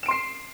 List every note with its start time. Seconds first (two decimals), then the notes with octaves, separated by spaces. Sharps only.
0.03 E7
0.06 D7
0.08 C6
0.11 C7